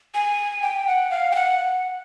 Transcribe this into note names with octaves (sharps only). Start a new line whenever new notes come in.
G#5
G5
F#5
F5
G5
F#5